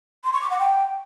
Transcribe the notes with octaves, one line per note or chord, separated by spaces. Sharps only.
C6
C#6
D6
F#5
G5